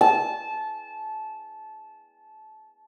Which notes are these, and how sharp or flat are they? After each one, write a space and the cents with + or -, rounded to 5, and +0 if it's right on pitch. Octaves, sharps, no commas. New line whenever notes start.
A5 -20